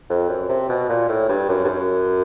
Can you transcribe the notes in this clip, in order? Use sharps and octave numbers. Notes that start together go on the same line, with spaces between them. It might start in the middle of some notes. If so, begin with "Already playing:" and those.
F2
F#2
C3
B2
A#2
A2
G2
F#2
G2
F#2